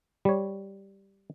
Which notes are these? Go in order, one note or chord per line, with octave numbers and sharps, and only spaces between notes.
G3 C#5